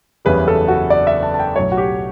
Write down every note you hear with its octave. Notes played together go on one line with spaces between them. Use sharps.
F#1 E2 C#3 G3 B4
A4
F#4
D5
E5
A5
A5
G5
B1 A2 F#3 C#5
F#4
G4